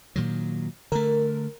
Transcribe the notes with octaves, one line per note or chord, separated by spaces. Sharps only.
A#2 D#3 F#3
D3 A3 A#4